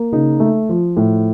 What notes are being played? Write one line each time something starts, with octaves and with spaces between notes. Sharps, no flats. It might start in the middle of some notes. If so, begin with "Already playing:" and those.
Already playing: A#3
C#3 D#4
A3
F3
A2